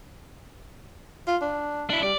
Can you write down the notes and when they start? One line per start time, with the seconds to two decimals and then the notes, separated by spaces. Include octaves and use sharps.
1.28 F4
1.41 D4
1.90 D4 E4
2.03 G3 D5